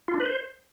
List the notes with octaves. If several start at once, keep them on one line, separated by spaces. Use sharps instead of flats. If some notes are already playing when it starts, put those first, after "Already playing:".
F4
D4
B4
C5